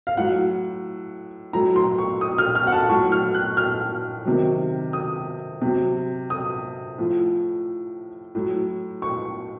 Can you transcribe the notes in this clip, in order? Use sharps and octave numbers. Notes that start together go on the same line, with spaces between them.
F5
A2 F#3 F#5
A2 F#3 A#5
C6
C#6
D#6
F6
F6
F#5
A5
A2 F#3 C#6
F6
F#6
F6
C3 D#3 F#3
D#6
C3 F#3
D#6
A2 F3
A2 F#3
C#6